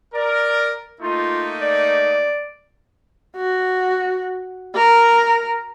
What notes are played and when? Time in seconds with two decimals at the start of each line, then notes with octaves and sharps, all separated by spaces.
0.15 A#4 D5
1.01 A3 A#3 D#4 F4
1.61 D5
3.36 F#4
4.75 A#4